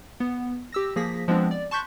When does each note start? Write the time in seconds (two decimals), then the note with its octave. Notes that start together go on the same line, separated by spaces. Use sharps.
0.20 B3
0.72 G4 E6 A#6
0.96 F3 A#3 G#4 A#6 B6
1.28 F3 G#3 B3 C4 D4
1.51 D5
1.71 A5 C6 C#6 F#6 G6 B6